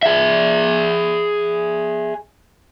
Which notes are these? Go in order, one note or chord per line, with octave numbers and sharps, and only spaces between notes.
G#4 E5